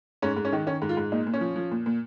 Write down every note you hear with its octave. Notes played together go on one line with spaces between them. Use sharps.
G#2 C#4
G#2
C#4
D#3
D#3 C#4
G#2
F4
G#2
A#2 D#4
A#2
C#4
F3
F3
A#2
A#2